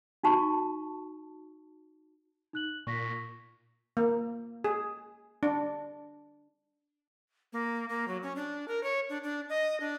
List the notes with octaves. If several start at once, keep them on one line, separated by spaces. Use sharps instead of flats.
D#4 F#4 A5 C#6
D#4 F#6 F#7
A#2 C#6 A#6 B6
A#3
G#4
D4
A#3
A#3
F#3
C#4
D4
A#4
C#5
D4
D4
D#5
D4